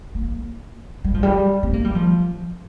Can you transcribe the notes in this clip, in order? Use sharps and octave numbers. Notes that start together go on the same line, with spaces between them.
A#3
G3
F3
G3
C4
A#3
G3
F3